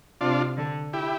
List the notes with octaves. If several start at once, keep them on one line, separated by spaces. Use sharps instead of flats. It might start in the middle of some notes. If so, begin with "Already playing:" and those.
C3 D4 F4
D3
E4 G4